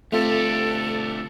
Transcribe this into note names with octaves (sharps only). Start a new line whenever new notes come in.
D2 A3 C4 F4 G4 A4